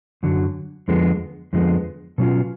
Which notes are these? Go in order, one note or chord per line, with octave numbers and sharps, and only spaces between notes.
F#2 D3 F#3
F2 D3 F3 G#3 B3
F2 D3 F3 G#3 B3
B2 F#3 C#4 F4